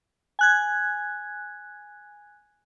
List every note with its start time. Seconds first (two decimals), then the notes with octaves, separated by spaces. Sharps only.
0.39 G#5 F#6 G#6